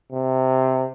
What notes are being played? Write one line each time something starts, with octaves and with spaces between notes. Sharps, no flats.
C3